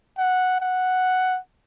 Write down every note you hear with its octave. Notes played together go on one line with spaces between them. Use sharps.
F#5
F#5